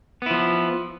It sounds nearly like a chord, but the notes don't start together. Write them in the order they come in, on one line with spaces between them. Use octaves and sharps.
B3 E4 F3